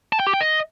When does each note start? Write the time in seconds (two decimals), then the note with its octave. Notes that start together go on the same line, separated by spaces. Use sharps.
0.13 A5
0.20 G5
0.27 G4
0.34 G5
0.41 D#5